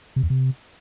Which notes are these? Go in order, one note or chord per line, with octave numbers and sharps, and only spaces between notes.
C3
E2
C3